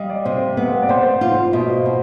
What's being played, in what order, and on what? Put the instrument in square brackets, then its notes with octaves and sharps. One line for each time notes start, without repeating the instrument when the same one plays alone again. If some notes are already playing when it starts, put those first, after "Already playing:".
Already playing: [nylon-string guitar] G3 [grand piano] D#5 F5
[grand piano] D5
[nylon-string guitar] C3 [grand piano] C5
[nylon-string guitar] B3
[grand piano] D5
[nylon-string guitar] B3 [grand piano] C5
[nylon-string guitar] F4
[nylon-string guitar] B2 [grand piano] D#5
[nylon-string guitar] B2